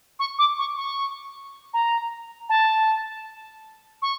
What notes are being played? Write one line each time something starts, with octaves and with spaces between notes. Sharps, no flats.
C#6
D6
C#6
C#6
A#5
A5
C#6